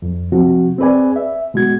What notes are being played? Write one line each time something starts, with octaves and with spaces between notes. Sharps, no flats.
F2
C3 F3 C4 F#4
C4 G#4 B4 D5 G#5
E5
B2 G#3 F#4 G#6